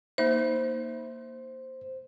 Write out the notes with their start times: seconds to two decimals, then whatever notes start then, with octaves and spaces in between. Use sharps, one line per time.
0.18 A#3 D#4 C5 E5